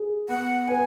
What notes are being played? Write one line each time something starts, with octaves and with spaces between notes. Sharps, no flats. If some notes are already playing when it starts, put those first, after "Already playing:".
Already playing: G#4
B3 F#5
B4 G#5